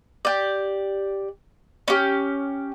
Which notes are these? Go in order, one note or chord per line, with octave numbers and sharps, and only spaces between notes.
G4 D5
C#4 G4